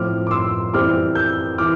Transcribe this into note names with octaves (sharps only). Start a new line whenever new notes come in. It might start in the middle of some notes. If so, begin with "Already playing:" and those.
Already playing: A2 F3 C4 D6 F6
D6
C6 E6
F2 E3 G3 C4 D6 F6
E6 G6
E3 D6 F6